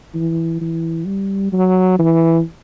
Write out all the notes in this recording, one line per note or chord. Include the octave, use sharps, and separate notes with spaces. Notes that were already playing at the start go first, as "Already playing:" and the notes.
E3
E3
G3
F#3
E3